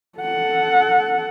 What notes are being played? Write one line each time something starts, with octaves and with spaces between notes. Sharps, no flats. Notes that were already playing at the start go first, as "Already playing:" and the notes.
A4 F#5